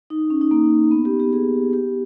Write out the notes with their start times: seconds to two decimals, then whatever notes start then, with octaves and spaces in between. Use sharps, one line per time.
0.10 D#4
0.30 C#4
0.41 D#4
0.51 A#3
0.91 B3
1.05 G4
1.20 G4
1.33 G#4
1.73 G4